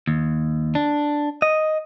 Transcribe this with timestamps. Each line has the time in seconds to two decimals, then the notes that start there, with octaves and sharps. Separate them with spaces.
0.07 D#2
0.75 D4
1.42 D#5